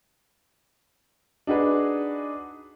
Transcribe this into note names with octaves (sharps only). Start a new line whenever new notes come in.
D4 D#4 F#4 G#4 B4